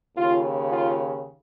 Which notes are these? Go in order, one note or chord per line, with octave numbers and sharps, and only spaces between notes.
D#2 C#3 F4
F4